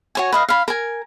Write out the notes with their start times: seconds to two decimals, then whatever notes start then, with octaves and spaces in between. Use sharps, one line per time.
0.15 F#4 C#5 G#5
0.32 B4 D#5 F5
0.49 F5 B5
0.68 A#4 G#5